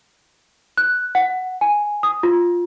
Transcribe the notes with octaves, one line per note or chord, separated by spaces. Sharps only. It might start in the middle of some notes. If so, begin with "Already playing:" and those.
F#6
F#5
G#5
D#6
F4